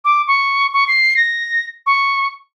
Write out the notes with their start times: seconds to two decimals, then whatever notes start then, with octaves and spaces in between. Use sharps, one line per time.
0.05 D6
0.28 C#6
0.73 C#6
0.88 C7
1.17 A#6
1.86 C#6